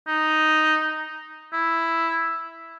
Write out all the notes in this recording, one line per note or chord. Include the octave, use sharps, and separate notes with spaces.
D#4
E4